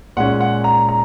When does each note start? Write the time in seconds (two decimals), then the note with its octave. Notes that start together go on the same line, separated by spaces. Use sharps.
0.17 A#2 G#3 C#4 F#5
0.41 F#5
0.64 A#5
0.89 A#5